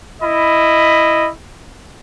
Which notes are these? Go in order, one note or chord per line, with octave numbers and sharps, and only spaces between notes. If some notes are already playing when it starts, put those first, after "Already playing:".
E4 D#5 B5